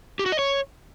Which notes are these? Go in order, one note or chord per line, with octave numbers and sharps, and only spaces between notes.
G4
F#4
D#5
C#5